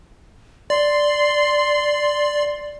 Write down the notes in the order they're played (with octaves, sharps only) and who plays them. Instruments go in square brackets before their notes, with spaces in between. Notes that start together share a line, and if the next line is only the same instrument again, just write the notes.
[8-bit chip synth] D5 [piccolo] C6